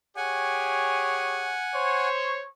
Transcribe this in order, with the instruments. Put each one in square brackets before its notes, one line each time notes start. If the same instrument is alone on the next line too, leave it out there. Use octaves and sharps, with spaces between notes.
[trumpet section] G4 G#4 C#5 [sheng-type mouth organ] F#5 G#5
[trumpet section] C5 C#5